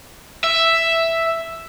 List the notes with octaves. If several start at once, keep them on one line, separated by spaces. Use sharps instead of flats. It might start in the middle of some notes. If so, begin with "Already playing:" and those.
E5